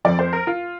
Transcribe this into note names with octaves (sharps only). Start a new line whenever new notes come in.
F2 F3 D5
C5
A#4
F4